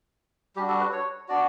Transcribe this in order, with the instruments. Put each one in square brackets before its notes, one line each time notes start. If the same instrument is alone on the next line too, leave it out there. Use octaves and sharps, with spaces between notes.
[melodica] G3 G4
D4 F#4
A4
B4
C#5
B3 D4 F#4 D5